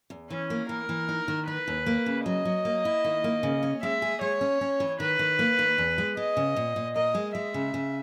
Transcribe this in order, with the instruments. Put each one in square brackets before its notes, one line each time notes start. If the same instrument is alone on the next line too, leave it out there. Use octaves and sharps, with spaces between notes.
[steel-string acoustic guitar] E2
[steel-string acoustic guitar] E3 [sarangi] C#4
[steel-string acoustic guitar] A#3
[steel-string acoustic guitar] E3 [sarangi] A#4
[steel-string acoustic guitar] E3
D#4
D#3
[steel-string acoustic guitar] D#4 [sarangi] B4
[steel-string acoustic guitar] D#2
A#3
C#3
[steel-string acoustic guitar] F#3 [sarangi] D#5
[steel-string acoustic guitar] F#3
A#3
E4
D#3
A#3
C#3
C#4
[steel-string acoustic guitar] G#3 [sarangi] E5
[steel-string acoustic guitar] G#4
[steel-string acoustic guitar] G#3 [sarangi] C#5
[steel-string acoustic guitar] C#4
C#4
E3
[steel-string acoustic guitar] D#3 [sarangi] B4
[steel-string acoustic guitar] D#3
A#3
D#3
E2
G#3
[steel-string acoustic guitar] G#3 [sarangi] D#5
[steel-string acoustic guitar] C#3
A#2
A#2
[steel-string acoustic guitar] A#4 [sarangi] D#5
[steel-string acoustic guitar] G#3
[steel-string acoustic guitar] G#3 [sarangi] E5
[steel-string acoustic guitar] C#3
C#3